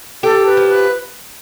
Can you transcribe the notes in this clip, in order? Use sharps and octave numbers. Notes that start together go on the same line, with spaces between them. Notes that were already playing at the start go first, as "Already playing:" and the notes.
G4 A4
B4
F3
B4